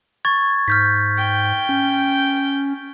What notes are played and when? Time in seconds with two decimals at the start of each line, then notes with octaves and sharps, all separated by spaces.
0.25 C#6 G#6 A6
0.68 G#2 F6 G6 B6
1.18 G5
1.69 C#4